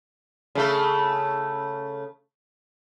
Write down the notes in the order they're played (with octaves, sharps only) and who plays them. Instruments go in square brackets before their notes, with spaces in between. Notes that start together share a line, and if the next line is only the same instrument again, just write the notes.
[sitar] C#3 A3 A4